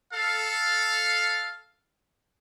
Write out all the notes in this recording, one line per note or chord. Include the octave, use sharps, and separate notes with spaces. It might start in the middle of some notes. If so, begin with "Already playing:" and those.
A4 F5